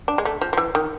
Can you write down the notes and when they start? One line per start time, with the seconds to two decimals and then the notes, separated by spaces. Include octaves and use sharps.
0.08 D4
0.18 G#3
0.25 A3
0.41 F3
0.53 F3
0.57 E3
0.75 D#3